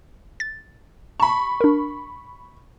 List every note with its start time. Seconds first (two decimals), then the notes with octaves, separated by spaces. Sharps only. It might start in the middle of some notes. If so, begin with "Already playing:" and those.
0.40 A6
1.20 A5 B5 C#6
1.61 D4 A#4